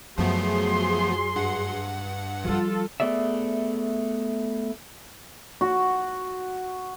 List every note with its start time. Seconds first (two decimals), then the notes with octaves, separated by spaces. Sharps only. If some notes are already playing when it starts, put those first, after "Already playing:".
0.18 F#2 F3 F#3 A3 B3 G#4 C6
1.36 G2 F#5
2.44 F3 G3 F4 A4
3.00 A3 B3 G#4 D5 E5
5.61 F#4